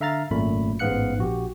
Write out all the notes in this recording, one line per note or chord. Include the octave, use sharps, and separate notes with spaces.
D3 E5 F5 A#5 F6 A6
G#1 F#2 A#2 A3 B5
A1 G#2 B3 F5 F#6 C#7
A#1 F#4 G4